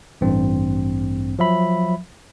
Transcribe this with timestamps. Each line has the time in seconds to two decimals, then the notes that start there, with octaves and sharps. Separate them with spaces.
0.21 A1 G2 C4
1.39 F3 F#3 E5 B5